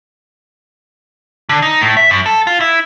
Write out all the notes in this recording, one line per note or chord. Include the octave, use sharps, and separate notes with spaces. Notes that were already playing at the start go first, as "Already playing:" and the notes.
D3
D#4
A2
E5
F#2
A4
F4
E4